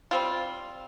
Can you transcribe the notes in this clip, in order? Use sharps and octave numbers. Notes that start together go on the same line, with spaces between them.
G3 C4 F4